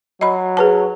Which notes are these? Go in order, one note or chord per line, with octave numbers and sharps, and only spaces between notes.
F#3 D#5 B5
G#4 B4 A5